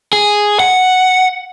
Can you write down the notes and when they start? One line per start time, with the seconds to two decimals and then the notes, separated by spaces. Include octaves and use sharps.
0.13 G#4
0.60 F#5